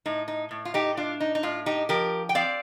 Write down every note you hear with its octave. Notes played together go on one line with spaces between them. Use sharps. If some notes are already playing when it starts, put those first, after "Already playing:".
A2 D#4
D#4
A2
F4
D#4 G4
D4 F4
D#4
D#4
A2 F4
D#4 G4
F3 G4 A#4
G5
C4 D5 F5